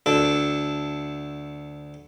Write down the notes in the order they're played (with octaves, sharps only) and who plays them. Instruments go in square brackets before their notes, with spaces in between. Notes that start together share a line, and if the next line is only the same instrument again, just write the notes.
[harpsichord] D2 D4 A4